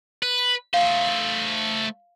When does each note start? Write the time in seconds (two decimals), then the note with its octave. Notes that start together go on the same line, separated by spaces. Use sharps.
0.23 B4
0.74 A3 C5 F5